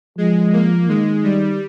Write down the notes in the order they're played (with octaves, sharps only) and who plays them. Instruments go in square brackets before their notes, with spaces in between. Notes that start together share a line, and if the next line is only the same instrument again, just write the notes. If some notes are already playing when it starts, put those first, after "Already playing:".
[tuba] F3 [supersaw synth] G#3
[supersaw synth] A#3
[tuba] D#3 [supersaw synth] G#3
[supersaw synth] G3